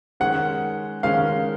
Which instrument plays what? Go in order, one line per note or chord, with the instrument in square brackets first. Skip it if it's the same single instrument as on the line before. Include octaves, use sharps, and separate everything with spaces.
[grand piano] D#3 G#3 C#4 [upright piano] F#5
[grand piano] D#3 G#3 C#4 [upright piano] F5